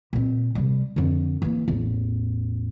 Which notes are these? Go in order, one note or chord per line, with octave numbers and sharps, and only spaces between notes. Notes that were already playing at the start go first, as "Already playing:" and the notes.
A#2 C4
C3 G3
F2 D3
E3 A#3
A1 E2